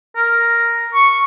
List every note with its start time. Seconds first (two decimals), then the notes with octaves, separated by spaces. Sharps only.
0.16 A#4
0.94 C#6